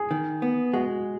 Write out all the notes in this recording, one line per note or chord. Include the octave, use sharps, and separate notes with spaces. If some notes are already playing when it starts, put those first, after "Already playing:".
Already playing: G#4
D#3
B3
G#3 F#4